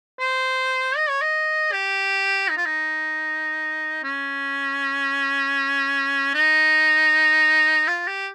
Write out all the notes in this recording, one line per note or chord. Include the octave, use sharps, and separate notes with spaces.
C5
D#5
C#5
D#5
G4
D#4
F4
D#4
C#4
D#4
F4
G4